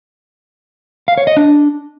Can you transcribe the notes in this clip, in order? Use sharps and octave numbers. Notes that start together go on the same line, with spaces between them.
F5
C#5
D#5
D4